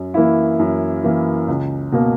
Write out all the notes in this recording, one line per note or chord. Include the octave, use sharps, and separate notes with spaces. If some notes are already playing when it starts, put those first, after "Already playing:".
Already playing: F#2
E3 A#3 E4
F#2
E3 A#3 E4
C#2
B2 A#3